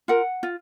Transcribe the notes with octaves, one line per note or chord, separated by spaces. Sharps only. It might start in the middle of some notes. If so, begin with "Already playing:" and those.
F4 A#4 F#5
F4